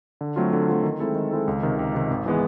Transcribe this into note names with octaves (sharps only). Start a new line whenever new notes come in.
D3
F#3 A3 C4 F4
D3
F#3 A3 C4 F4
D#3
G#3 C4 E4 A4
D#3
G#3 C4 E4 A4
C#2
C3 D#3
C#2
C3 D#3
G#1
E3 G#3 B3